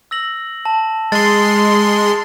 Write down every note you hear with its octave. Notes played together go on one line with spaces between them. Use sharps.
E6 A#6 F#7
A5
G#3 C6 A6